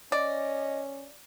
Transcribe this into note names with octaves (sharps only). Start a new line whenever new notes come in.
C#4 D5 D#5